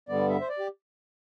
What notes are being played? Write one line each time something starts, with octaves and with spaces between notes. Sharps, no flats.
G2 D3 G3 B3 D5
E5
C5
D5
G4